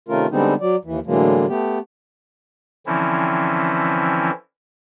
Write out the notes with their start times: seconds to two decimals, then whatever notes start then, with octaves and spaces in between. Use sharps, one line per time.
0.08 C3 D#3 A3 C#4 F4 A#4
0.31 D3 G3 G#3 B3 C4 D#4
0.61 F#3 D5
0.85 D#2 E3
1.06 A2 D3 E3 F#3 G#3 A#3
1.48 A3 B3 G4
2.86 D3 E3 F3 C4 C#4 E4